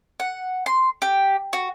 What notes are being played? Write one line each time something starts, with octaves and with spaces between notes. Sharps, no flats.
F#5
C6
G4
F#4